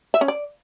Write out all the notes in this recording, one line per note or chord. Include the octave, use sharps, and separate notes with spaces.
E5
C#4
D5